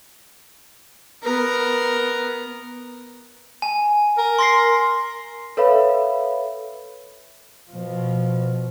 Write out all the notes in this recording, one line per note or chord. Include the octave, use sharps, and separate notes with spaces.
B3 A#4
G#5
A#4
C6 A#6 C7
A4 B4 C#5 E5 F5 B5
B2 F3